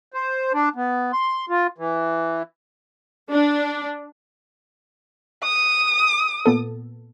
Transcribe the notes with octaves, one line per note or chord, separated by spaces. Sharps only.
C5
D4
B3
C6
F4
E3
D4
D#6
A#2 B3 A4